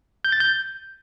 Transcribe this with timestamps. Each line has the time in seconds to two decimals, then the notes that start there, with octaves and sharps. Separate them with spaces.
0.25 G6
0.32 A6
0.40 G6